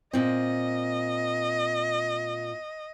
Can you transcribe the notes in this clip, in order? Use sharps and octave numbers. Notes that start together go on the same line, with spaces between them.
A#2 C4 D#5